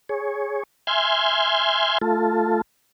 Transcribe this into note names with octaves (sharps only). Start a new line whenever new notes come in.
G#4 C#5
E5 G#5 C6 F6 G6 G#6
A3 F4 A4